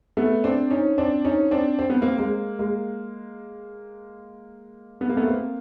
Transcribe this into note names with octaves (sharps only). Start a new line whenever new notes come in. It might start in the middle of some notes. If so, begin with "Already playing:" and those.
A3 B3
C4 D4
C#4 D#4
C4 D4
C#4 D#4
C4 D4
C4
B3
A#3 C4
G#3 A#3
G#3 A#3
B3
A#3
A3 B3
A#3 C4